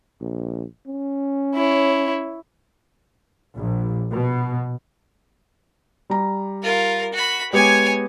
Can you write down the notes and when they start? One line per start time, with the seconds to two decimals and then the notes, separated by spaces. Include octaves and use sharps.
0.21 A#1
0.87 C#4
1.55 E4 C#5
3.58 A#1
4.11 B2
6.10 G3 A#5
6.63 F4 A#4
7.13 F#4 B5
7.53 G#3 B3 G4 C#5 G#5